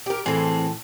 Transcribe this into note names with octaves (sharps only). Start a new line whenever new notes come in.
G4 A#4
A2 E3 C4 G#4 A4